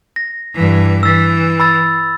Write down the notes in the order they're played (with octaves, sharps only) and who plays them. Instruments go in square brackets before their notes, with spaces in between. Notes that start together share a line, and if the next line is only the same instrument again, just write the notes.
[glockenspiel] A#6
[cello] G2 E3
[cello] E3 [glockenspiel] E6 A6
[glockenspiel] B5 E6 A6